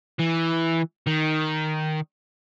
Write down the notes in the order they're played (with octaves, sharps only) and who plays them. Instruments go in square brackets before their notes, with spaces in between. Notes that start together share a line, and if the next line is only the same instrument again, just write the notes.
[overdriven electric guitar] E3
D#3